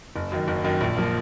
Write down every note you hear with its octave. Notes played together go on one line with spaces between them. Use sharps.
F#1
F#2 D#3
F#1
F#2 D#3
A#1
F3 A#3